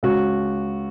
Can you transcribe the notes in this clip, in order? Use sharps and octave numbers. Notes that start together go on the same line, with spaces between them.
C#2 F#4